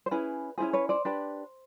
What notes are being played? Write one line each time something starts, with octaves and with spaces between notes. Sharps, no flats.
C5
C#4 E4 G#4 B4
C#4 E4 G#4 C5
B4 C#5
C5 D5
D4 G4 B4